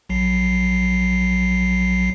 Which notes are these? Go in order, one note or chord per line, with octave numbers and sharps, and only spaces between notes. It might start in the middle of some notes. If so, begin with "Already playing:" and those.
A#1 F#3 C7